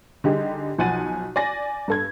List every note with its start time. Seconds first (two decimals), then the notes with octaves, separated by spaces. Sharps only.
0.24 D3 G3 D#4 G4 G#4
0.78 B1 F3 F#5 G#5 A6 D#7
1.36 D5 G#5 A#6
1.88 G2 A4 G#6